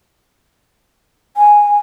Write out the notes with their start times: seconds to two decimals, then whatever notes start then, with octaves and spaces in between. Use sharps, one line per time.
1.37 G#5